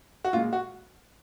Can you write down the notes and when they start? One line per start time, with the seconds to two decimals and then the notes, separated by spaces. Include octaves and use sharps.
0.24 F#4
0.33 A#2 G#3 F4
0.53 F#4